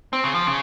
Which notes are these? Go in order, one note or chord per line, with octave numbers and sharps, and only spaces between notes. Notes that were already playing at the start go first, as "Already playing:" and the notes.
C4
C#3
F3
C#3